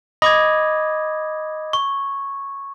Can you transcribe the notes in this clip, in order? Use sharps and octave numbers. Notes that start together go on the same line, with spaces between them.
D#5 B5 D6 G#6
C#6